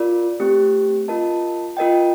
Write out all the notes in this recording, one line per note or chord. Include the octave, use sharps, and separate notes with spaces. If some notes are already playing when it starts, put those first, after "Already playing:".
Already playing: F4 A#4 D5
A3 C4 G4
F4 A#4 D#5 A5
F4 A#4 D#5 G5